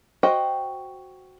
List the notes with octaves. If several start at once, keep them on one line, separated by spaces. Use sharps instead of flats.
F#4 C5 D#5 G5